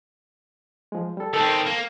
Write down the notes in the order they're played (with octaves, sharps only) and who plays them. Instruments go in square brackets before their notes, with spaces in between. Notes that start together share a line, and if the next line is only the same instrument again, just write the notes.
[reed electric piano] F3 G#3
G3 A4
[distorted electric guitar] D#3 C4 [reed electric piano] A4 A#4 G5
[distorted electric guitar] A#3